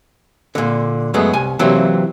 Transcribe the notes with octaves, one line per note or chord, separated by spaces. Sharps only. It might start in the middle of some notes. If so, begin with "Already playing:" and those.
A#2 D3
F#2 F#3 G#3 A3 B3
C2 G#5
C3 E3 F#3 A#3 C4